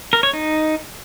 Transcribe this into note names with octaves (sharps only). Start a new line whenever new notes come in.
A#4
C#5
D#4